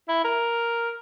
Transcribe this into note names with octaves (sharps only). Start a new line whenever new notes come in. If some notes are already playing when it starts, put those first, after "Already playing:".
E4
A#4